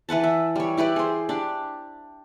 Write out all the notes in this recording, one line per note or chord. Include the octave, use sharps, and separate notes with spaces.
E3 B4 F#5 A5
E5
G3 C#5
E4 G4 B4 D5
G#4 C5
D4 G4